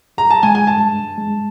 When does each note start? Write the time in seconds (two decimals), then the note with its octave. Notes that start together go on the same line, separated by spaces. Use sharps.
0.18 G2 A#5
0.30 A5
0.43 G#3 G#5
0.55 G#5
0.67 G2 A5
0.92 G2
1.17 G#3